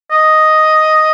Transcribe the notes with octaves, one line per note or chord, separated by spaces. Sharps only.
D#5